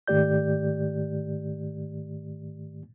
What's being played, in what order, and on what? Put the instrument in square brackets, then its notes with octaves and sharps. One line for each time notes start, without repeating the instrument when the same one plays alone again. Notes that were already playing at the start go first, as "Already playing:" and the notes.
[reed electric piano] G#2 D#3 A3 G4 D5 G6